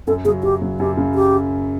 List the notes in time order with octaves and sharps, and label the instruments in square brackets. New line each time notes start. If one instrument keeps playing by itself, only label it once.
[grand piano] F#2 [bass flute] A4
[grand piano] C#3 F#3 [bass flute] G#4
[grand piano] F#2 [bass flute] G4
[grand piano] C#3 F#3
[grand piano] F#2 [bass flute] G4
[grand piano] C#3 F#3
[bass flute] G4